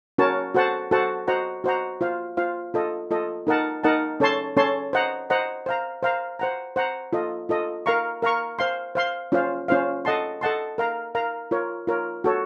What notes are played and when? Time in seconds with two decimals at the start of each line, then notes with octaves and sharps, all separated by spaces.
0.18 C#4 F#4 A#4 C#5 A5
0.54 F#4 A4 C5 F#5 A5
0.91 F#4 A4 C5 F#5 A5
1.28 F#4 C5 D#5 F#5 A#5
1.64 F#4 C5 D#5 F#5 A#5
2.01 F4 C5 F5
2.37 F4 C5 F5
2.74 F4 A4 D#5
3.11 F4 A4 D#5
3.47 D#4 A#4 D#5 F#5 A5
3.84 D#4 A#4 D#5 F#5 A5
4.20 C#4 A4 C#5 A5 C6
4.57 C#4 A4 C#5 A5 C6
4.93 C5 D#5 F#5 A#5
5.30 C5 D#5 F#5 A#5
5.66 C5 F5 A#5
6.03 C5 F5 A#5
6.39 C5 F#5 A#5
6.76 C5 F#5 A#5
7.13 F4 A4 D#5
7.49 F4 A4 D#5
7.86 A#4 F5 A#5 C#6
8.22 A#4 F5 A#5 C#6
8.59 C5 F5 C6
8.95 C5 F5 C6
9.32 C#4 F4 C5 F5
9.68 C#4 F4 C5 F5
10.05 A4 D#5 F#5 A5 C6
10.41 A4 D#5 F#5 A5 C6
10.78 A#4 F5 A#5
11.15 A#4 F5 A#5
11.51 F4 A#4 C#5
11.87 F4 A#4 C#5
12.24 F#4 A4 C#5